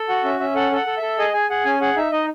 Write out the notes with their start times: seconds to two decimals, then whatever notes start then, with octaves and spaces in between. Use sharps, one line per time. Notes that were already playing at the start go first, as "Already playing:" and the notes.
Already playing: A4
0.09 F#4 F#5
0.24 C#4 E5
0.40 C#4 E5
0.55 A4 F#5
0.72 A4 F#5
0.87 A4
0.97 A4 E5
1.18 G#4 D#5
1.33 G#4 G#5
1.50 G#4 F#5
1.65 C#4 G#5
1.81 G#4 F#5
1.97 D#4 E5
2.12 D#4 D#5